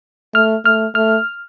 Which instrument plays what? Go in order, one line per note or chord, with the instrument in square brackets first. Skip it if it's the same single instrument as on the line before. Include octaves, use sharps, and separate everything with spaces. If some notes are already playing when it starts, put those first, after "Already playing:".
[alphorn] A3 [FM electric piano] F6
[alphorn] A3 [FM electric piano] F6
[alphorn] A3 [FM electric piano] F6